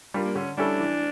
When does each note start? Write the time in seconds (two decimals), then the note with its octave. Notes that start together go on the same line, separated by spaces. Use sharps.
0.14 G3 D4 F4 A#4
0.25 A#3
0.36 D3 C#4
0.57 G3 C#4 D4 E4 A4
0.80 E3